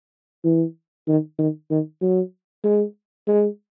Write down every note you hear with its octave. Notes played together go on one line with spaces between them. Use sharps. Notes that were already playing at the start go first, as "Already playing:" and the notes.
E3
D#3
D#3
D#3
F#3
G#3
G#3